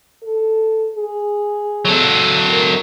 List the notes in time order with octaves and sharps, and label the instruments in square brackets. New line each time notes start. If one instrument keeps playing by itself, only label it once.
[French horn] A4
G#4
[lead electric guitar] F#3 A4
[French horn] A#4